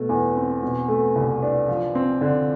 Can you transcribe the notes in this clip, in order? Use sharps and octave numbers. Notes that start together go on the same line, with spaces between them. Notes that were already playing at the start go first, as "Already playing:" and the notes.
Already playing: B2 A3
E2
C4
B2
A3
C2
D4
F3
C4
D3